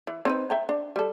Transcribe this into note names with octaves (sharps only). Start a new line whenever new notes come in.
E3
C4 D#4 B4
E5 G5 A#5
D4
G3 A4